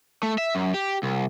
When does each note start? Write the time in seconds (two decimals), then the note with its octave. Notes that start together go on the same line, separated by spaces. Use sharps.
0.23 A3
0.38 E5
0.55 F#2
0.74 G4
1.03 C2